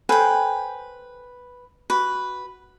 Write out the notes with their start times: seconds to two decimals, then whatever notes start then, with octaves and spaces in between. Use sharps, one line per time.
0.09 A4 B4 C5 G5 G#5
1.90 F#4 B4